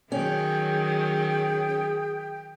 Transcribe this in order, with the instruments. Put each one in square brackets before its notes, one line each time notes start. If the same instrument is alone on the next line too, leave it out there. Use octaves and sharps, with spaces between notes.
[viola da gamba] D#3 F#3 [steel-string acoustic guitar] C#4 [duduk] G#4 [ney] G5